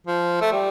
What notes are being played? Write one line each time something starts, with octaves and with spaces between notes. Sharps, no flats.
F3
A3
G3